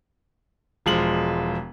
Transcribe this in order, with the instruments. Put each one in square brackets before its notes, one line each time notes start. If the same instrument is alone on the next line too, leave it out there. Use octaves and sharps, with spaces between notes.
[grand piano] E1 F3 G#3 F#7